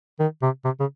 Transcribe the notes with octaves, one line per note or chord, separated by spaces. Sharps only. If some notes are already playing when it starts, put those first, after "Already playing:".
D#3
C3
C3
C#3